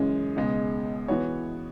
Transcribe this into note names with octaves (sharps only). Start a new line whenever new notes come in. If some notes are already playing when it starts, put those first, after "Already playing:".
Already playing: F#2 C#3 E3 G#3 C#4
C#2 B2 G#3
E3 B3 F#4 C#5